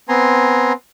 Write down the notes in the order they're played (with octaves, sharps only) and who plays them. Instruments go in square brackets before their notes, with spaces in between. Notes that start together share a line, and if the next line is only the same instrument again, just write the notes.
[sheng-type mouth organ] B3 C4 G#5 A#5 C6